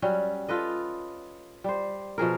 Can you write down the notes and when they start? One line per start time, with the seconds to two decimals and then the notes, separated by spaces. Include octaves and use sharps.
0.02 F#3 G3 C#4
0.49 F4 A4 B4 D#5
1.64 G3 C5
2.18 B2 F3 G#4 A#4